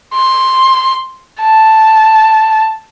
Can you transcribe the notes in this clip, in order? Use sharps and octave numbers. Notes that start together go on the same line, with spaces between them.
C6
A5